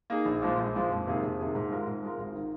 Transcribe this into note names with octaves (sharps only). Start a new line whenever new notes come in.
A#3 D#4 G#4
A#1
A#2 F3 G#3
A#1
A#2 F3 G#3
F2
C3 D#3 A#3 G#4
F2
C3 D#3 A#3 G#4
G#2
G#3 F4 A#4
G#2
G#3 F4 A#4
G#1
D#3